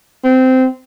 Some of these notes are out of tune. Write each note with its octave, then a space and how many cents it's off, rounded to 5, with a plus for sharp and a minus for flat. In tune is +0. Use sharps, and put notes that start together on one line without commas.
C4 -15